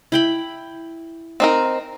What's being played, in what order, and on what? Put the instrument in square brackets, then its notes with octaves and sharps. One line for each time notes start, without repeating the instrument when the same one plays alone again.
[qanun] E4 G5 B5
[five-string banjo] C4 D#4 A#4